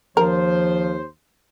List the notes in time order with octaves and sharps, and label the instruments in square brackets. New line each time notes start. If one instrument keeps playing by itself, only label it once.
[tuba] D#2 [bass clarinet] F3 [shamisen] A#4 [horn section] C5